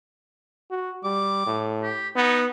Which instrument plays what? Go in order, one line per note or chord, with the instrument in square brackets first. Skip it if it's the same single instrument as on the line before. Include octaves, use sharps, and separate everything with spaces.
[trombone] F#4
[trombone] G3 [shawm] D6
[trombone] A2
[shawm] G4
[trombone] B3 [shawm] D#4